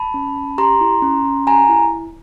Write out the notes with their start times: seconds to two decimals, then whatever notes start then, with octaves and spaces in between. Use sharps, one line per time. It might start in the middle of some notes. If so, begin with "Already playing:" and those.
Already playing: A5 B5
0.14 C#4
0.36 C#4
0.58 G4 A#5 C6
0.81 E4
1.02 C#4
1.25 C#4
1.46 G4 G#5 A#5
1.69 E4